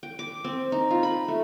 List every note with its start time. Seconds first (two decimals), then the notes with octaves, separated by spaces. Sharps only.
0.03 G5
0.19 D6
0.44 C4
0.72 D#4
0.91 F4
1.03 B5
1.28 A3